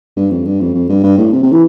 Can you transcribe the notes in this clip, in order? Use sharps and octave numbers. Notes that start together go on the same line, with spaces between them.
G2
F2
G2
F2
F2
G2
G2
A2
C3
C3
E3